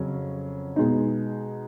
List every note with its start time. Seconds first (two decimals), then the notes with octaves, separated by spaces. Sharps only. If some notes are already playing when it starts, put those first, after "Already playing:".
Already playing: F2 C#3 F#3 C#4
0.76 B2 G#3 B3 D#4